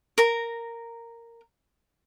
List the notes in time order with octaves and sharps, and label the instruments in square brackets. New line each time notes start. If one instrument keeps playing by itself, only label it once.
[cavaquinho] A#4 A#5